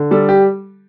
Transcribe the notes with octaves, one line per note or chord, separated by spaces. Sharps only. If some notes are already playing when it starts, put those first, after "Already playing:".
Already playing: D3
G3 A4
G4